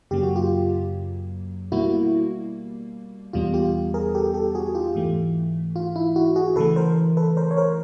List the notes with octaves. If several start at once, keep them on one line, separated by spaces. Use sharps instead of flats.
F#2 C#3 F#3 A#3 G4
F#4
F4 G4
B2 G3 A#3 E4 F#4
E2 B2 G3 B3 F4
F4 G4
G#4 A#4
G4 A4
G4 A4
F#4 G#4
F4 G4
G#2 E3 A3
F4
E4
E4 F#4
F#4 G#4
C#3 E3 A3 A4 B4
A#4 C5
A4 B4
A#4 C5
C#5
A#4 C5